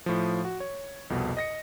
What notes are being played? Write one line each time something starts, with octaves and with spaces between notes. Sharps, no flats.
A2 F3
F#4
C#5
C2 F2 B2
D#5 A#6 C#7